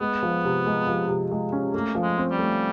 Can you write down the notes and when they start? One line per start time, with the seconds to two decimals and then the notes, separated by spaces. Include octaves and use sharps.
0.01 G#3 B3
0.23 F3
0.45 C3
0.66 G#3
0.87 F3
1.09 C3
1.31 G#3
1.52 C#4
1.74 A3 A#3
1.95 F3
2.03 G#3
2.18 C4
2.31 G3
2.39 A3